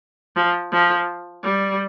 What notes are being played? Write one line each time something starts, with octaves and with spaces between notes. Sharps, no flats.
F3
F3
G3